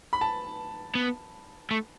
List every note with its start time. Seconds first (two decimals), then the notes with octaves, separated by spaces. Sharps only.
0.13 B5
0.21 A5
0.95 B3
1.71 A3